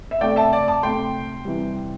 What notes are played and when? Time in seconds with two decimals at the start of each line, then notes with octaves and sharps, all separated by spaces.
0.11 E5
0.21 C3 A3 D5 G5
0.36 E5 A5
0.53 D5
0.68 A5 D6
0.83 C3 A3 G5 C6
1.45 C3 E3 G3